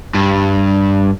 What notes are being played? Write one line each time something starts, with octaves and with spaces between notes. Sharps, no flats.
G2